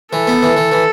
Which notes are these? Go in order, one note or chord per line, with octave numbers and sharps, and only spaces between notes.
E3 A4
B3
E3
E3
E3